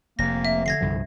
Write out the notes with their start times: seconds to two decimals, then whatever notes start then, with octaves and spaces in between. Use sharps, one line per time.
0.19 F1 C3 A#3 A#6
0.45 E5
0.66 D3 G#6 A#6 C7
0.81 C2 G2 F3